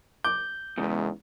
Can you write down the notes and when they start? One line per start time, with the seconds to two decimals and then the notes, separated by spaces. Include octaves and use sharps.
0.25 D6 G6
0.77 E2 G#2 C#3